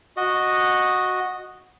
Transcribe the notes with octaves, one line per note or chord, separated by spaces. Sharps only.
F#4 D#5